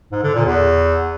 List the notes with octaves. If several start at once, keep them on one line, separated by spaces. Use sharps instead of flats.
G#2
D3
A#2
E2